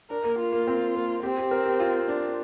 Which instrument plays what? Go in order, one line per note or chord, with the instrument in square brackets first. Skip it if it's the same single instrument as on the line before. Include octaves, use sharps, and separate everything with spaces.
[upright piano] D4 [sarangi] A#4
[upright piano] A#3
[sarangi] F4
[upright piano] A#3
C4
A#3
[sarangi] C4 [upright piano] G4
[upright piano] G4
A#4
G4
F4
D4